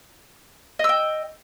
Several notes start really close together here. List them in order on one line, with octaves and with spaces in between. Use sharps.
D#5 E6 G5